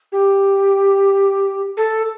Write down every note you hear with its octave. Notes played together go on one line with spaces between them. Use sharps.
G4
A4